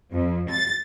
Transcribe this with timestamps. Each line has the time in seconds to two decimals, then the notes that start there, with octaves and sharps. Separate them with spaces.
0.12 F2
0.50 A6